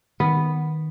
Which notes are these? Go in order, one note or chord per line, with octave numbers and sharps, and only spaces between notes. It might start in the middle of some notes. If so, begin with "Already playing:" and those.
D#3 B3